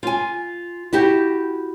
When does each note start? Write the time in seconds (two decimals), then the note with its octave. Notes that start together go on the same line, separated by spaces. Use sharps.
0.03 F4 G#5
0.93 E4 F#4 G4